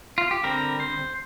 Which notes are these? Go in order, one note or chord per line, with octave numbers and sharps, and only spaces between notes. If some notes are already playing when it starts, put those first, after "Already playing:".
F4
G4
D3 G3 C4 A#4
C5